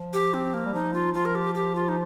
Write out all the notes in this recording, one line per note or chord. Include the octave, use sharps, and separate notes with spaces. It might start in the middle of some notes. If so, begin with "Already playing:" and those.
Already playing: F3
G4
C4
A#3
G3
F3 D#4
F4
F3 F4
A#4
G4
G4
F4
D#4